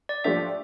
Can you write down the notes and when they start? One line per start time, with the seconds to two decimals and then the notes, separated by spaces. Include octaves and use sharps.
0.09 D5
0.24 F3 A3 D4 G4 E5